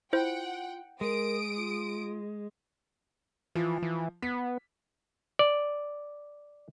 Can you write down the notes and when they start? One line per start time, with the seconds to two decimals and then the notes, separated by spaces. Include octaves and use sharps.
0.13 E4 F4 C5 F#5 G5
1.01 G#3 A#4 D#6 D7
1.57 F4
3.55 E3 F3
3.82 E3
4.23 B3 B6
5.39 D5